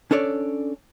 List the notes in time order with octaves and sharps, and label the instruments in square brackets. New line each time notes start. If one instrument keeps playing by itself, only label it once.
[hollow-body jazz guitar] C#4 D4 A4 C#5 D5